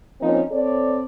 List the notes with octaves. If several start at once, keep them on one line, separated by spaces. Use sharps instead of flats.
F3 A#3 C4 C#4 D#4
C4 A4 C#5 D5